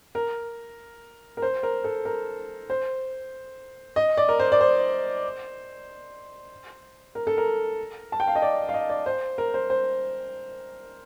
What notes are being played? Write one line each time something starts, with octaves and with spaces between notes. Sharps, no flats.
A#4
A#4
C5
A#4
A4
A#4
C5
D#5
D5
A#4
C5
D5
C5
A#4
A4
A#4
A5
G5
F5
D#5
D5
F5
D#5
D5
C5
A#4
C5
C5